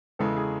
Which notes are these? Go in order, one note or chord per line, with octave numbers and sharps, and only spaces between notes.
E2 C#3 E3 G#3 A4
G#4